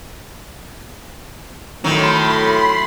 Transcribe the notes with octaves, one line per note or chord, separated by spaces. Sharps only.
A2 D#3 F#3 B5 C6